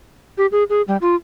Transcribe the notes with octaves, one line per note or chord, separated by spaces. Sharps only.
G4
G#4
G#4
G3
F4